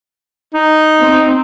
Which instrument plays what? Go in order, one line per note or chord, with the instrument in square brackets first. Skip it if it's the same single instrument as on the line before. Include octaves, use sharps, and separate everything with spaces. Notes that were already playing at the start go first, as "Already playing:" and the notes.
[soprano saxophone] D#4
[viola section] C4